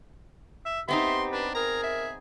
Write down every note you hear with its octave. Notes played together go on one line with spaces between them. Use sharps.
E5
B3 C4 D#4 G4 E5 C6
D4 B4
G#4 A#4 A#5
E5